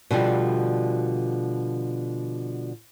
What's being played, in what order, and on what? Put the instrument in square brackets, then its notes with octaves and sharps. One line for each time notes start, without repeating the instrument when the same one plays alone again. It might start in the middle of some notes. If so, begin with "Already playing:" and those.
[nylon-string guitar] B2 D3 F3 G3